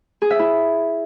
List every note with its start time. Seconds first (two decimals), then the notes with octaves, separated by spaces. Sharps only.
0.22 G#4
0.30 E5
0.39 E4